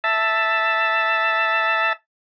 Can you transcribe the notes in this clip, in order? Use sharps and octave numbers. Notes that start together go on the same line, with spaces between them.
E5 A5